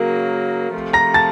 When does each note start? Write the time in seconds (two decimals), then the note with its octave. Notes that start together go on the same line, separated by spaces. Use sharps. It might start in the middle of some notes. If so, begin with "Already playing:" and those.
Already playing: C#3 F#3 A#3 A#4
0.74 C3 F3 A3
0.93 A#5 A#6
1.14 A5 A6